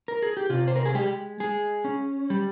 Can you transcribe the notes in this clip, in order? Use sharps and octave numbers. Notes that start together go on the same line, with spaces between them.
A#4
G#4
G4
C3 F4
C5
A#4
G#4
G#3 G4
G#3 G#4
C#4
G3